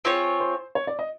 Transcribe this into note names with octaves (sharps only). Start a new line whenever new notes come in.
C4 F4 G#4 C5 C#5
C5
C#5
D5
D#5